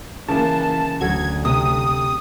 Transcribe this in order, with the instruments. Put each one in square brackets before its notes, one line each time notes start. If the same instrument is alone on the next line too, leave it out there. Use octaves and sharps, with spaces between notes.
[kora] C#3 D5 [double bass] E3 A#3 [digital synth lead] A5
[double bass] D2 [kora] F#3 F#4 A4 [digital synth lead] G#6
[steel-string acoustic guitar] C3 [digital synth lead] D#6